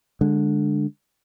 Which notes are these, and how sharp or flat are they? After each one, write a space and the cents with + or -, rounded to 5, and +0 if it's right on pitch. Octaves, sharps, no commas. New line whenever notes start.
D3 +0 G#3 -20